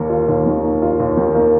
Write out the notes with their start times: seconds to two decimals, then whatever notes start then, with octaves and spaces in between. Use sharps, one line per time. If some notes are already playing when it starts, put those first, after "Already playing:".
Already playing: D#2 D#3 A#3
0.09 F4
0.29 D#2
0.46 D#3
0.63 A#3
0.82 F4
1.00 D#2
1.17 D#3
1.35 A#3